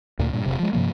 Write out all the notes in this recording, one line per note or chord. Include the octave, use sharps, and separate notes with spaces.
D2 A#2
G2 A#2
E1 C#2 C3
F3 G#3
G2 C3 F3 A#3